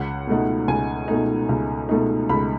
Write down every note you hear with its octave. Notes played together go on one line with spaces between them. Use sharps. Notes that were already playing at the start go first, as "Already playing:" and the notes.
Already playing: C#2 F#5
B2 A3 D#4
C#2 G#5
B2 A3 D#4
C#2
B2 A3 D#4
C#2 B5